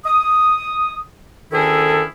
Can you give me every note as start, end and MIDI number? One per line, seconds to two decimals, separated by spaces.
0.06 1.01 87
1.52 2.03 38
1.52 2.03 51
1.52 2.03 61
1.52 2.03 64
1.52 2.03 68
1.52 2.03 69